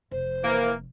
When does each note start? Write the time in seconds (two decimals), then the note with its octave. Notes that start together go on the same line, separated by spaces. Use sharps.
0.11 F1 C5
0.44 E3 A#3